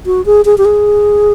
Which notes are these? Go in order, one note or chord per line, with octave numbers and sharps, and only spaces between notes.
F#4
G#4
G#4
G4
G#4